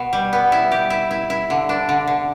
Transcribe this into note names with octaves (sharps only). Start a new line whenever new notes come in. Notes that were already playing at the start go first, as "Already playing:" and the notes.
Already playing: B2
G3
B3
E4
G4
E4
E4
E4
D3
D4
D3
D3